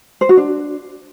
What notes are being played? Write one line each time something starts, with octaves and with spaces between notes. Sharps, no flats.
C5
F#4
D4